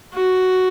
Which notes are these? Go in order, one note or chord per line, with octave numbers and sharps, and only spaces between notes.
F#4